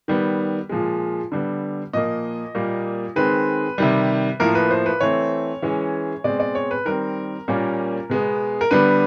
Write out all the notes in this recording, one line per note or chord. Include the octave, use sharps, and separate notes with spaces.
D#3 G3 B3
A#2 F3 G#3
D3 G3 B3
A#2 F3 A#3 D#5
A#2 G3 A#3
D#3 G#3 C4 B4
C3 D#3 G3
A2 F3 A#3 A#4
B4
C5
B4
E3 A3 C4 C#5
E3 G#3 C#4
B2 G#3 C4 D5
D5
C#5
B4
D#3 G3 C4 A#4
A#2 G3 A#3 C#4
B2 G#3 B3
A#4
D3 G3 B3 B4